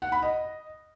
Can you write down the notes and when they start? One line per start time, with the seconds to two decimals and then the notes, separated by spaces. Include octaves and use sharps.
0.02 F#5
0.12 B5
0.22 D#5